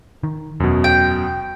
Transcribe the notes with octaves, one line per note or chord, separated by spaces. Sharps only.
D#3
E1 F#2 B2
G5